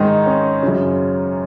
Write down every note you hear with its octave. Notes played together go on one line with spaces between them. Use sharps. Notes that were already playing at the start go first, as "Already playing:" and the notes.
Already playing: G#2 D#3 D#4
C#4
F#2 C#3